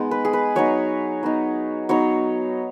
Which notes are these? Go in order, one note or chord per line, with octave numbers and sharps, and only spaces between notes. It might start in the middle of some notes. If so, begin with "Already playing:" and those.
Already playing: G#3 B3 D#4
B4
G#4
B4
F#3 B3 D#4 C#5
F#3 B3 D#4
F#3 B3 D#4 C#5